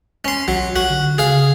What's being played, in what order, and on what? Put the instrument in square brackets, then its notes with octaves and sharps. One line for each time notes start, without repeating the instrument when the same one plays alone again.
[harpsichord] C#4 C6
[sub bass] B1 [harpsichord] F#3
[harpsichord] F#4
[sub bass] D3
[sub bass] C#3 [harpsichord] G#4 F5